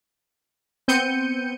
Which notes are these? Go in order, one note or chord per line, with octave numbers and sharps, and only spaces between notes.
B3 C4 G6 C#7 D#7